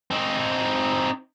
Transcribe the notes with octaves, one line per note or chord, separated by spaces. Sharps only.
C4 D#4